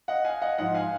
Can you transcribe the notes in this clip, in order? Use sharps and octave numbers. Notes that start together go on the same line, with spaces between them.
D#5 F#5
F5 G#5
D#5 F#5
G#2 F3 D#5 F#5
F5 G#5